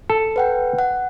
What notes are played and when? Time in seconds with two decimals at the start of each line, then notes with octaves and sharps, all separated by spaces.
0.10 A4
0.36 B4 F#5 G5
0.79 F#5